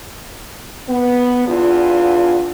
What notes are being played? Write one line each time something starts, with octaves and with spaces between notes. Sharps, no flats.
B3
E2 D4 F4